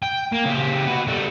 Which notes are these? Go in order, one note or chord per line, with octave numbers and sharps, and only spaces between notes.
G5
A#3
C#3 G4
B3 F#4
G3 A4